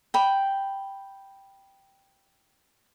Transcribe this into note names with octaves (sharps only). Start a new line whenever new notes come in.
G5 B5